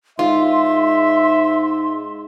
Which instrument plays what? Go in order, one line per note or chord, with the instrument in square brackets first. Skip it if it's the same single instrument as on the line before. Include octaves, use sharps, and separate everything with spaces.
[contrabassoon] G#2 [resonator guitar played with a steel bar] F4 [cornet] E5 [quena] C6